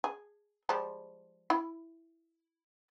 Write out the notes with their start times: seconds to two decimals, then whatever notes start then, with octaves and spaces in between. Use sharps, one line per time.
0.04 G#4
0.69 F3 G3 G#3
1.50 E4 B5